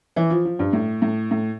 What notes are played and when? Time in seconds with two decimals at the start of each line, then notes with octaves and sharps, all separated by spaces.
0.16 E3
0.30 F3
0.45 F3
0.59 G2
0.73 A2
1.02 A2
1.31 A2